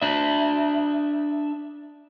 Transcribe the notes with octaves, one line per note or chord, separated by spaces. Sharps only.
D4 E5